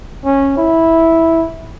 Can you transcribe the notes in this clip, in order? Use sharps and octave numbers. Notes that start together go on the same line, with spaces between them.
C#4
E4